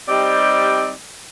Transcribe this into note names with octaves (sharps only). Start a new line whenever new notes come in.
G3 C4 D#4 G4 D5